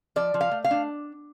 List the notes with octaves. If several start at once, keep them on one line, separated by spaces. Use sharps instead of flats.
F3 D5
F3
F5
A3
F5
D4